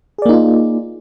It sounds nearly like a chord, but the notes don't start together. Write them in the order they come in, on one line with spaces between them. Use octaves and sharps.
G#4 D5 A#3 D#4 F4